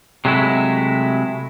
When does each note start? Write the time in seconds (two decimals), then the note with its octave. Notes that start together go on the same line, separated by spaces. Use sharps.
0.25 C3 F#3 G#3 A3 E4